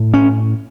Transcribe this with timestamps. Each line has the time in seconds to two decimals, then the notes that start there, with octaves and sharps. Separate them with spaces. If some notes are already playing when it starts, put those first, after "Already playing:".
Already playing: A2
0.14 C#4